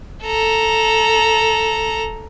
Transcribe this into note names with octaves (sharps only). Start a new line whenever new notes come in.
A4 A#5